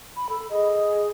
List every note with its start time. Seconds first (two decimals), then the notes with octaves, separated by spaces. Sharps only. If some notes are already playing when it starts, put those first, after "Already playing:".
0.16 B5
0.29 A4
0.50 G#4 D#5